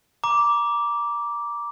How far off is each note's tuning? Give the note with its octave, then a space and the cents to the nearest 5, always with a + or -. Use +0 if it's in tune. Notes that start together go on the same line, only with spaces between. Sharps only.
A#5 +25 D6 -5